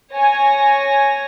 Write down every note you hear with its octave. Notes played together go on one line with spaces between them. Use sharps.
C#5 G#5 A#6